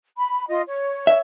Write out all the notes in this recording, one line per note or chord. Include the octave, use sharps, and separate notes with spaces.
B5
F4 D#5
C#5
E5